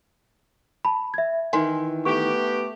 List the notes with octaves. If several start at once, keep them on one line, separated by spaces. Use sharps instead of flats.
A5 B5
E5 G#6
D#3 E3 G#5 C6
A3 B3 G4 C#6